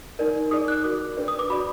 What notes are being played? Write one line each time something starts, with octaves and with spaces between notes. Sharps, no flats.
D#4 A#4 D5
D#4 G#4 D5 D#6
F#6
F#4 A#4 D5 D6
D4 G#4 B4 D5
D#6
D6
F#4 D5 B5